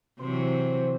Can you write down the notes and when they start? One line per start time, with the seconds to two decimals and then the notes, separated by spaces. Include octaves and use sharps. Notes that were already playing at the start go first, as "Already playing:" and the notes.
0.19 C3 E3 F#3 C5